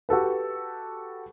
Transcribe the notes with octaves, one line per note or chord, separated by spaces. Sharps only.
F#4 G4 A4 B4